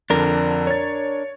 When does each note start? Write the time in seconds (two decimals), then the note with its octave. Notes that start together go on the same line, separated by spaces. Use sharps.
0.10 F2 D3 D4 A#4
0.67 C#5 A6